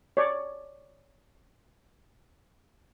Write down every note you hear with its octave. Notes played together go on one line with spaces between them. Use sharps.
C#5 D5